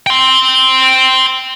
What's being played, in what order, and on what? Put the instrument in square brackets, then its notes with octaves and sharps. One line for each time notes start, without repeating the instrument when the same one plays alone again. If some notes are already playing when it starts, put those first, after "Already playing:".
[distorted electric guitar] G5 C6